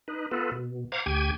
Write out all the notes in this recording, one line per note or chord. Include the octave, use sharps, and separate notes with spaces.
D#4 B4
B3 F4 A4 B4
B2
C5 F5 F#5 A#5 D6 G#6
D2 G4 G5 G#5 G#6